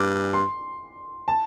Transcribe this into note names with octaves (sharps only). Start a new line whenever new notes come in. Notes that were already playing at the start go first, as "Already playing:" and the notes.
Already playing: G2 D6
C6
A5